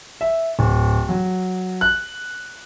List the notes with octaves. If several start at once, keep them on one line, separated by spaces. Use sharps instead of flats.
E5
D1
F#3
F#6